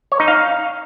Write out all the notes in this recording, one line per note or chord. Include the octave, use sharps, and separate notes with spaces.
C#5
D#4
F5